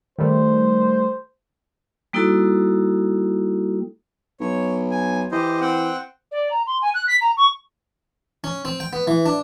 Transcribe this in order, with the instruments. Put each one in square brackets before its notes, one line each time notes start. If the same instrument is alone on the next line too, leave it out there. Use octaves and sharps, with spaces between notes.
[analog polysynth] D#3 G3 A3 [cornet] C5
[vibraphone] G3 A#3 D#4 E4 F#4 A4
[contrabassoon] B1 [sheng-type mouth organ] C#5
[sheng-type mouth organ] G#5
[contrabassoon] E3 [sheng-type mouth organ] G4 C5 D#5
[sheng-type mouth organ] C4 F#5 G5
[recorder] D5
A#5
C6
G#5
F#6
B6
A#5
C#6
[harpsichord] C#4
C4
G5
B3
E3
D4